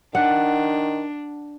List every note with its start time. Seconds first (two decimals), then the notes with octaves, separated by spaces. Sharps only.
0.15 D#3 D4 F#5